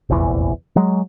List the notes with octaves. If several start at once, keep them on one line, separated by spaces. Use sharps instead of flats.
F1 A#1 E2 E3
F#3 G#3